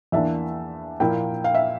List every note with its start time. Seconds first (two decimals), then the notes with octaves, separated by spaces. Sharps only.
0.12 E2 E3 A#3 D4 E5
1.00 A#2 F3 A#3 E4 G5
1.44 F5
1.54 E5